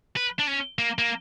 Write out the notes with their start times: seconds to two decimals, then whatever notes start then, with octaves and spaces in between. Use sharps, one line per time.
0.16 B4
0.39 D4
0.47 C#4
0.79 A#3
0.98 A#3